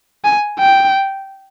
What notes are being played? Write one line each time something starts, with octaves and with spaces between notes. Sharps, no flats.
G#5
G5